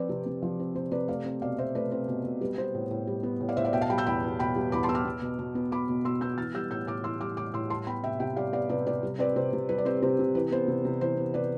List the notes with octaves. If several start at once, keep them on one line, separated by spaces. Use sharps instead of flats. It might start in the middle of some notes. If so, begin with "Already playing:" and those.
Already playing: F3 C4 B4 D5
C3
C3
F3
C4
C3 C5
C3 B4 D5
A3 D5 F5
C4
B2 D5 F5
B2 C5 E5
A3 B4 D5
C4 C5
B2
B2
G3 B4
B3 C5
A2
A2
G3
B3
A2
D5 F5
A2 C5 E5
D5 F5
B2 E5 G5
F5 A5
G3 G5 B5
E6 G6
E2 G5 B5
B3
B2 G5 B5
G3
E2 B5 D6
A5 C6
B3 E6
D6 F6
B3
B2
B2
B3
B3 B5 D6
B2
B2 C6 E6
B3 E6 G6
E3 F6 A6
G3 E6 G6
A2 E6 G6
A2 D6 F6
E3 C6 E6
G3 D6 F6
A2 D6 F6
A2 C6 E6
G3 A5 C6
B3 G5 B5
C3 E5 G5
C3 E5 G5
G3 D5 F5
B3 D5 F5
C3 B4 D5
C3 B4 D5
G3
C4 B4 D5
C3 C5
C3
G3 B4
D5
C4 C5
C3 C5
C3
E3 B4
B3 C5
C3
C3
E3 C5
B3
C3 B4 D5